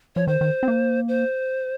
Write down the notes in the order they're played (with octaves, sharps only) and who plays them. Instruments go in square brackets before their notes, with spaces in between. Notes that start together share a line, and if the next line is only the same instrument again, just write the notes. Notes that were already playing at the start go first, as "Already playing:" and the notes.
[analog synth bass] F3 [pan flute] C#5
[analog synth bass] D#3 [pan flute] C5
[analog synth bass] D#3
C4
A#3
[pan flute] C5